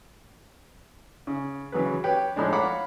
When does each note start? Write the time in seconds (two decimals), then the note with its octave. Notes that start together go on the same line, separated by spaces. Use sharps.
1.27 C#3
1.72 C#3 E3 F#3 G#4 B4
2.04 G4 B4 C#5 G5
2.36 A2 F3 G#3 D4
2.53 C#5 F5 F#5 A#5 B5 D6